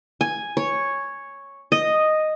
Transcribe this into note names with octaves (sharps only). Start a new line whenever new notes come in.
G#5
C#5
D#5